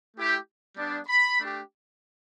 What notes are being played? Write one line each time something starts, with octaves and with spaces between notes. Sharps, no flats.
A3 E4 G4
G3 B3 D4
B5
A3 D4 G4